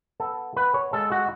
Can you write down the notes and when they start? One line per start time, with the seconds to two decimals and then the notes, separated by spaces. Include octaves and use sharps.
0.20 B3 A4
0.56 B3 B4
0.74 C#5
0.93 G#3 A4
1.12 F#4